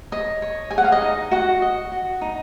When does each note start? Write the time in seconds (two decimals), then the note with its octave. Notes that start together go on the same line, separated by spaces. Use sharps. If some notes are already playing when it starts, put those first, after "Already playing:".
0.12 C#5 D#5
0.42 C#5
0.71 G#4 G#5
0.78 F#5
0.84 F5
0.92 D#5
1.02 D#4
1.31 F#4 D#5 F#5
1.62 D#5
1.92 F#4
2.21 D#4